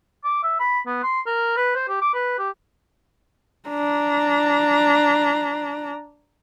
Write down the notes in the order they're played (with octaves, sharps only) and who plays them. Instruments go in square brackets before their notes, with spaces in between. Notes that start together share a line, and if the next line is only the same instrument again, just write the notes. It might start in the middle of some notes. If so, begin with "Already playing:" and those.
[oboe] D6
E5
B5
B3
C6
A#4
B4
C5
G4
D6
B4
G4
[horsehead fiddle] D4 A#5